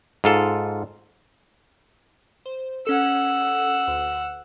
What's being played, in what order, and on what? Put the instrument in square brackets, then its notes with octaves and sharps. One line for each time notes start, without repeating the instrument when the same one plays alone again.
[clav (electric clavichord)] G#2 F4 A4
[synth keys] C5
[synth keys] C#4 A4 [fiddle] F#5 E6
[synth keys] D2